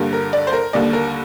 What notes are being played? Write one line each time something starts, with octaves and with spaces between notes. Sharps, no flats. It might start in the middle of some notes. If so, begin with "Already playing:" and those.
Already playing: G2 D3 G3 A#3
A#4
D5
C5
A#4
D#2 D3 G3 A#3 D5
A#4